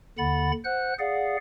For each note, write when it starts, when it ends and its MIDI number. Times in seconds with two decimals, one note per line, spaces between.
0.18 0.52 39
0.18 0.52 50
0.18 0.52 78
0.18 0.52 83
0.18 0.52 93
0.65 0.94 72
0.65 0.94 78
0.65 0.94 90
0.99 1.37 68
0.99 1.37 74
0.99 1.37 77
0.99 1.37 78